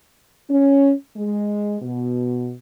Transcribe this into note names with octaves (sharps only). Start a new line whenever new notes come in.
C#4
G#3
B2